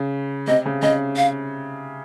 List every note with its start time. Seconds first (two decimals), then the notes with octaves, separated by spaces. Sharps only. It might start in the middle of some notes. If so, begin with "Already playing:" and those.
Already playing: C#3
0.47 C3 D#5
0.66 C#3
0.82 C#3 D#5
1.17 F5